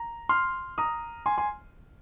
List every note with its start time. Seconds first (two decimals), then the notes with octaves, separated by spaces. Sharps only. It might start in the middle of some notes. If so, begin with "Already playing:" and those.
Already playing: A#5
0.29 C6 F6
0.78 A#5 D#6
1.26 G#5 C6
1.38 G#5 C6